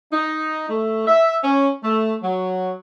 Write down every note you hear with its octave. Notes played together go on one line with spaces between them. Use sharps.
D#4
A3
E5
C#4
A3
F#3